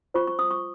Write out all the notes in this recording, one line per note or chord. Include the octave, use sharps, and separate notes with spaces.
F4 C5 C#6
C#6
D#6
C#6